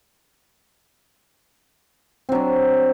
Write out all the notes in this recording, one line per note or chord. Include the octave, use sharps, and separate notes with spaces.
F#3 C4 D4